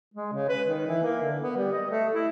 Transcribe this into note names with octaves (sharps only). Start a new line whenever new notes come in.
G#3
C#3
B4
D#3
E3
A#3
D3
B3
G3
D#5
A3
E4